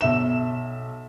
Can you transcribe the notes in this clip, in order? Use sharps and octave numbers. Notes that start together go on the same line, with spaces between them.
B1 E5 E7